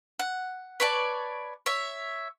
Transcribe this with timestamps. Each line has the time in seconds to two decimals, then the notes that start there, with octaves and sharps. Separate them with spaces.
0.19 F#5
0.80 B4 C#5 D5 A5
1.66 C#5 E5